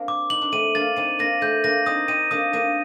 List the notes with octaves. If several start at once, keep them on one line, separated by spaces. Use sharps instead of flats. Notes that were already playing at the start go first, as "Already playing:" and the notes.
Already playing: A#3 C4 D4
D6
D#4 F#7
D4
A3 C4 D#7
A#3 D4 A6
C4 D#4 D#7
A#3 D4 A#6
A3 C4 G6
A#3 D4 A#6
C4 D#4 D#6
C4 D#4 D#7
A#3 D4 D#6
A#3 D4 D#7